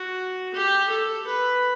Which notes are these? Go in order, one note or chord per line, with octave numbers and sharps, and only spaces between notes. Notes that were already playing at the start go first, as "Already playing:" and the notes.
Already playing: F#4
G4
A4
B4